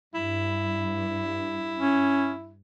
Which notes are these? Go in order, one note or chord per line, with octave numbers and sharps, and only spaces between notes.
G2 E4
C#4